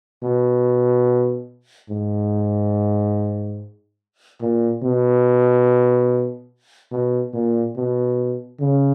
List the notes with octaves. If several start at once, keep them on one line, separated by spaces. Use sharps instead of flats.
B2
G#2
A#2
B2
B2
A#2
B2
C#3